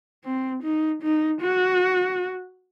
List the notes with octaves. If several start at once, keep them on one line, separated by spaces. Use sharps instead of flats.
C4
D#4
D#4
F#4